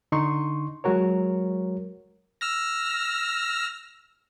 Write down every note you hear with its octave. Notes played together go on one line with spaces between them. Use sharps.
D3 D#4 C6 C#6
F#3 G#3 F#4 A#4 C#5
E6 F6 A#6